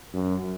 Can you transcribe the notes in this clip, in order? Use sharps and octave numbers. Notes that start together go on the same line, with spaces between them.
F#2